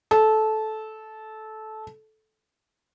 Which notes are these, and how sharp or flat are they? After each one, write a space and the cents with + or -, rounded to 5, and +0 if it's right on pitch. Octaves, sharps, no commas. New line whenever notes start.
A4 -15